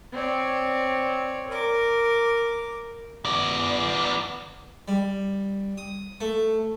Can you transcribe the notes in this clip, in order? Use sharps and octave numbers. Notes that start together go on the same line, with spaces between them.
C4 C#5 D5
A#4 D6
B3 D5
G3
D#6
A3